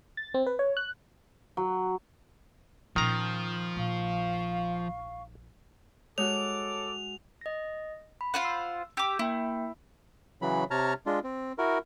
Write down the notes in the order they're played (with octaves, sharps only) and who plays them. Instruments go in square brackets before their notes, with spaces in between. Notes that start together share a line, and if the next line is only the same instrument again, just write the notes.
[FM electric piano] A6
C4
B4
C#5
F#6
[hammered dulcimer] F#3
[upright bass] A#2 C#4 [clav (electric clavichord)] D#3 A#5 [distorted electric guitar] F3
[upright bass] A#1 [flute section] F5 C#6
[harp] G#3 F#4 [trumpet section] A4 D6 [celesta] C#5 [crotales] F7
[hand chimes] D#5 A#6
B5
[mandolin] F4 C5 F#5
[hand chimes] E6
[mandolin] G4 D6 [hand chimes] E6
[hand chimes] A#3 G5 [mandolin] E4
[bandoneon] C#3 E3 F#3 B5
C3 C#5 A5 A#5 F6
G#3 D4 F4
C4
E4 F#4 A#4